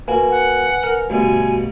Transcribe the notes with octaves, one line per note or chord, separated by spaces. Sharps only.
A#3 F#4 B4 G#5
F#5
A#4
D2 G2 B2 F#4 G#5